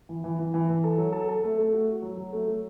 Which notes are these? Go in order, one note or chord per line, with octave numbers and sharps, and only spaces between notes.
E3
E3
E3
E3
E3
A4
F#3
A4
A4
A3
A3
F#4
F#4
F#3
F#3
A3
F#3